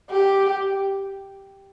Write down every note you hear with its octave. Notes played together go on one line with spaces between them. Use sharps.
G4